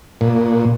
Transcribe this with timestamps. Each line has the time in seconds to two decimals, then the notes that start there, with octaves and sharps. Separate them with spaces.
0.21 A#2